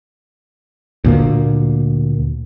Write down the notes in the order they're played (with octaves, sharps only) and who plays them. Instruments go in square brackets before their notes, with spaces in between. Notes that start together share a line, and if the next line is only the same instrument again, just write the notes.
[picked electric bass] D2 A#2 A#3